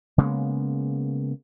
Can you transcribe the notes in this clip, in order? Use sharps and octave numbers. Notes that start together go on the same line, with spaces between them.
C#3 G#3 A#3 B3